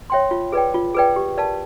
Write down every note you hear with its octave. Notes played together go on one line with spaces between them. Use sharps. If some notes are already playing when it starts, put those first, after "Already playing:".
C#5 E5 G5 C6
F4
G#4 B4 D5 G5
F4
G#4 B4 D5 G5
G4
A#4 D5 F5 A5